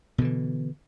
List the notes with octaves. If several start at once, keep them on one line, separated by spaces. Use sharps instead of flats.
B2 D3 E3